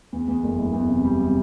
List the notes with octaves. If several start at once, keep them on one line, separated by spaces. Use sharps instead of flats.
E2
E2
F#1
F#1
E2
C3
G3
C3